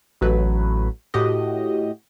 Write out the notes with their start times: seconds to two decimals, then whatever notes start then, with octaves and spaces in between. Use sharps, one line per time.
0.21 A1 F#3 A3 B4
1.14 A2 F#4 G4 D#5